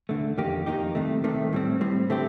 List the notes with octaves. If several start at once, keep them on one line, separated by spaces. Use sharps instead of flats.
D2 D3 A3
F2 D#3 A#3 D#4 G4
F2 D#3 A#3 D#4 G4
C2 C3 D#3 A3
C2 C3 D#3 A3
A2 G3 C4
A2 G3 C4
D3 A3 C4 G4